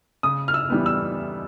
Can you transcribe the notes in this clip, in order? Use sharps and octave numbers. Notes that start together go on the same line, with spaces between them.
C#3 D#6
F6
E6
E3 G3 B3
E6